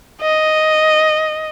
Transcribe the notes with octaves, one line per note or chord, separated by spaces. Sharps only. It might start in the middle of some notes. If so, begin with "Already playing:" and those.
D#5